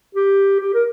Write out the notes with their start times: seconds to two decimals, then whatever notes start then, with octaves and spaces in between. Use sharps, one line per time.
0.15 G4
0.60 G4
0.74 A#4